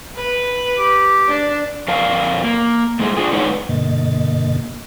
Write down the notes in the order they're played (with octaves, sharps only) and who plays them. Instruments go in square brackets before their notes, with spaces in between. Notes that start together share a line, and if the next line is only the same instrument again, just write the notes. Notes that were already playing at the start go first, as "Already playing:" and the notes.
[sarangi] B4
[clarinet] G4
[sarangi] D4
[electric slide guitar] F2 A#4 D5 F5 A5
A#3
G#2 G#3 A3
D4 F4 G#4
G#3 D4 D#4 B4 C#5
[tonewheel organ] G2 B2 D3 A#3 D#5 A6